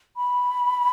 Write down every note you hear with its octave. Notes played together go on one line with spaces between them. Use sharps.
B5